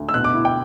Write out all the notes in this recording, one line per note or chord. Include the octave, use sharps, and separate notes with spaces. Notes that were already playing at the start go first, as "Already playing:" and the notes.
Already playing: D2
E6
B2 F#6
D6
E4
G5